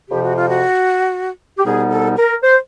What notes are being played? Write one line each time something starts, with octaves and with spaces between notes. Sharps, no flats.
F2 C3 F3 G4
F#4
F4
F#4
G4
C2 B2 G3 B3 D#4 G#4
A4
A#4
C5